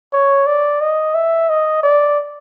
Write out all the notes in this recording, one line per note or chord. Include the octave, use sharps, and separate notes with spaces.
C#5
D5
D#5
E5
D#5
D5